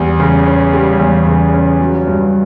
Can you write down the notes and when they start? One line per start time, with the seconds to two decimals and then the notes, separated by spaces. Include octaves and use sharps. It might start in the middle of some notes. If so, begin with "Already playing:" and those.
Already playing: E2 G3
0.20 C#3
0.46 C#4
0.73 G3
0.99 E2
1.27 C#3
1.54 C#4
1.80 F#3
2.07 G2